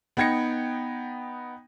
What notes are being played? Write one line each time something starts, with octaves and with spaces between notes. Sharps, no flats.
B3 D#4 G5 G#6 A#6 C#7